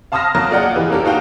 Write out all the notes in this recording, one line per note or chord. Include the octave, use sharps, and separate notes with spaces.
F5 A5 C6 D#6 F6 A#6
F#3 A#3
F4 G#4 D5 D#5 F#5 G5
E3 G4 G#4 B4
A#3 C#4 D4 G4 A4 A#4
D#4 F#4 F5 G5 A5